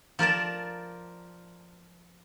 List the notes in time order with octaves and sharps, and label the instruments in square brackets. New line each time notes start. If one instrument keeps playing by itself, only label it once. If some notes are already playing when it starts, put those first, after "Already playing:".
[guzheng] F3 A#4 D5 A5